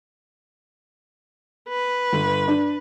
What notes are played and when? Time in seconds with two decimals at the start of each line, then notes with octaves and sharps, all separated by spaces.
1.69 B4
2.13 G1
2.48 D4